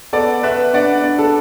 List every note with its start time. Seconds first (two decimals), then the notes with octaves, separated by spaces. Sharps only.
0.13 B3 A4 D5
0.43 B3 B4 E5
0.73 D4 D5 F#5
1.04 D4
1.19 A4